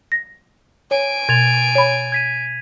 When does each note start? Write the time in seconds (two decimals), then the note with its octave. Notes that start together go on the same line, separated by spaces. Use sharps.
0.12 A#6
0.91 C#5 G#5 D7
1.29 B2 G#6 A6 F7
1.75 C#5 B5
2.12 G#6 B6 D#7